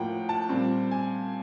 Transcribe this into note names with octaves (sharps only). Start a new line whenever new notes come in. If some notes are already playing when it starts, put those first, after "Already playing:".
Already playing: A2 F3 A#3 F#5 G5
A5
A#2 G3 C4
G#5